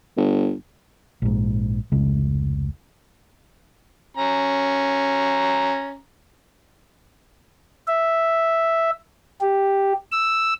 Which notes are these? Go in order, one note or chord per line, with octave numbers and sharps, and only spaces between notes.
G1
A#1 G#2
F1 C#2 C#3 G#3
C#4 A#5
E5
G4
E6